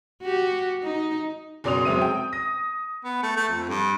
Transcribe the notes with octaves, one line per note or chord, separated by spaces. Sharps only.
F#4 G4
D#4
F#1 B2 D5 C6 D#6 F7
F1 F#3 G#3 C4 E5 D#7
G5
D#6 A#6
B3
A3
A3
F2
G2